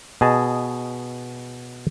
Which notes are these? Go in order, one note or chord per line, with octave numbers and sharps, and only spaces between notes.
B2 G#4 D#5 A5